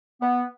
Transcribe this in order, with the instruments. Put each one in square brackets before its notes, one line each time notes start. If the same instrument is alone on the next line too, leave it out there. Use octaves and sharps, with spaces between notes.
[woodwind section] B3